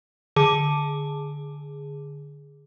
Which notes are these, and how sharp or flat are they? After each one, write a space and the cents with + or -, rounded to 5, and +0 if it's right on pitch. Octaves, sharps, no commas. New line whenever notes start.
D3 +0 G#4 +0